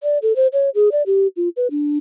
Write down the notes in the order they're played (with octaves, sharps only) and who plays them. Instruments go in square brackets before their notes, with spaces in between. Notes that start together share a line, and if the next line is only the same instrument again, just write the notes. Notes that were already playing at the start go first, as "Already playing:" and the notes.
[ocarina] D5
A4
C5
C#5
G#4
D5
G4
F4
B4
D4